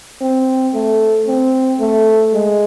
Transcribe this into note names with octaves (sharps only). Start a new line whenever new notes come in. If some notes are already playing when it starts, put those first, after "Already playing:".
C4
A3
C4
A3
G#3